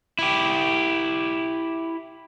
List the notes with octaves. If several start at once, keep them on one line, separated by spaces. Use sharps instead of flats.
E4 G4